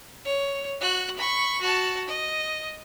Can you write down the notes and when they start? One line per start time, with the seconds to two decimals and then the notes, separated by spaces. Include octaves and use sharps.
0.25 C#5
0.81 F#4 F#6
1.16 B5 C#6
1.61 F#4 A5
2.07 D#5